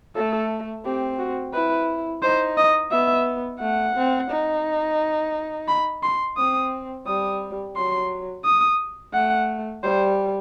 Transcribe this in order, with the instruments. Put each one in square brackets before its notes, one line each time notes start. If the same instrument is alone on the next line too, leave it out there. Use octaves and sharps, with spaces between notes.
[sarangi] A3 [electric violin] A4
[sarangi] C4 [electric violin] G4
[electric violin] F#4
[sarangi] E4 [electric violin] B4
[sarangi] D#4 [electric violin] C5
[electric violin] D#5
[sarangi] B3 [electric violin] E5
[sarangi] A3 [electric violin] F#5
[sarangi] C4
D#4
[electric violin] B5
C6
[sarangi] C4 [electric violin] D#6
[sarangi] G3 [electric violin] D#6
[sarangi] F#3 [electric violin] C6
[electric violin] D#6
[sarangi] A3 [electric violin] F#5
[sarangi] G3 [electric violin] C5